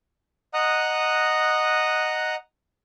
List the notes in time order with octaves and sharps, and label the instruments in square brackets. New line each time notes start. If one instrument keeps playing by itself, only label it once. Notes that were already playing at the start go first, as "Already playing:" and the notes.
[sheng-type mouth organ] D#5 F#5 A#5 D#6 F#6